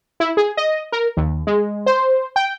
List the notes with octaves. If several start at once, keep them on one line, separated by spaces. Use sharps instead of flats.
E4
G#4
D#5
A#4
D#2
G#3
C5
G5